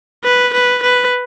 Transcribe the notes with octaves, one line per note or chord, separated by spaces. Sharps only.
B4
B4
B4